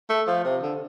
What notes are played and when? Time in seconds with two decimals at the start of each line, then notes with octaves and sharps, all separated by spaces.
0.10 A3
0.27 F3
0.44 C3
0.62 D3